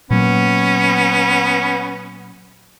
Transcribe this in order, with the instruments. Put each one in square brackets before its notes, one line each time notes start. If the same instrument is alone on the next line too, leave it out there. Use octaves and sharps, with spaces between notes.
[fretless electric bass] A#2 F#3 A#3 [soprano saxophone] B3 [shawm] C#4